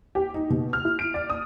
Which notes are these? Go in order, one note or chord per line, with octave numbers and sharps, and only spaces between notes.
G4
D#4
B2
F6
E4
D7
D5
D#6